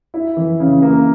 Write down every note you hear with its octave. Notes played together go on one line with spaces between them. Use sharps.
E4
E3
C#3
A#3